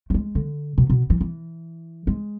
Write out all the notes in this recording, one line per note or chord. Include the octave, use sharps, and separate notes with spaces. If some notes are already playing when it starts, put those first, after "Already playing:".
A3
G#3
D3
B2
B2
E3
E3
G#3